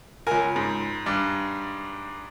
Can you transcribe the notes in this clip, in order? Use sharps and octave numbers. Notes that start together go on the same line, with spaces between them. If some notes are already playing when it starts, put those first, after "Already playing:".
C#2 A#4 G#5
G#2
G2